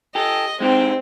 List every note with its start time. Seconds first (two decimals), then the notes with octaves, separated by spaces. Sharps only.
0.15 G4 A4 D#5
0.60 G#3 C4 D#4 G4